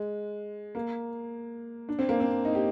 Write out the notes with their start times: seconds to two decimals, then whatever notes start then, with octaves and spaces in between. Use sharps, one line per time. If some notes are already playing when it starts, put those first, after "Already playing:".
Already playing: G#3
0.75 A#3
1.89 D4
1.99 C4
2.09 A#3
2.20 C4
2.45 D#4
2.55 G4